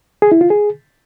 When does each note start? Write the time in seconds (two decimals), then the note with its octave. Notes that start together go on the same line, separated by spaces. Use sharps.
0.22 G#4
0.32 E4
0.41 F4
0.50 G#4